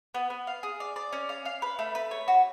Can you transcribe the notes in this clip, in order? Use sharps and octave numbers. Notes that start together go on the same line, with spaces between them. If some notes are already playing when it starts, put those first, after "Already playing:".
B3
B3
F5
G#4
D5
D5
C#4
F5
F5
B4
A3
B4
C#5
F#4